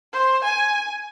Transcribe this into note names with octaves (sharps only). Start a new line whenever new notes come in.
C5
G#5